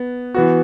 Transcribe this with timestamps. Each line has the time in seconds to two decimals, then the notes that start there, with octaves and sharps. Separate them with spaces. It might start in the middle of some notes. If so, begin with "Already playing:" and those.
Already playing: B3
0.34 E3 B3 F#4